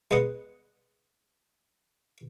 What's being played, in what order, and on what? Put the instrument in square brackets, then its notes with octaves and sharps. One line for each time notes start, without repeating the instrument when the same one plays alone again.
[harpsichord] G#3 B3 D#5 F#5